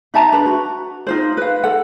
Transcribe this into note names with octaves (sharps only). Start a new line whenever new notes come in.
D#4 E5 A5 A#5
D4 B4
F#4
D#4 F4 C5
B4 F5
A4 F#5